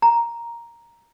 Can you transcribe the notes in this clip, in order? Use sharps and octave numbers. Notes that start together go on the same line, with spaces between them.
A#5